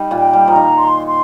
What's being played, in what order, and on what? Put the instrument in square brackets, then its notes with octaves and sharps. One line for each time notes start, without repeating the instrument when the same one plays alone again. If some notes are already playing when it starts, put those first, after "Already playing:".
Already playing: [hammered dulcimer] G3 D#4
A#2 A#3
[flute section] G5
[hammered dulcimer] G3
[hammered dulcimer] F3 [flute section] A#5
[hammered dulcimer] D#3
[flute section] C6
C6